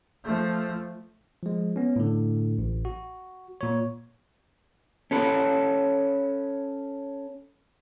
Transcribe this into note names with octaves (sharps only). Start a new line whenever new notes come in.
F3 A3
F3 G#3
B3 C#4
A2 D3
A1
F#4
A#2 C#5
C#4 A4 B4